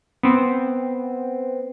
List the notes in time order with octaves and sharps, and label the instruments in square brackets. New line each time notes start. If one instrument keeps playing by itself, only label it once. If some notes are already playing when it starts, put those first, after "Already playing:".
[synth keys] B3 C4